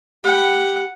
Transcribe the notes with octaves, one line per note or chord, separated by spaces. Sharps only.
G4 F#5 G5 B5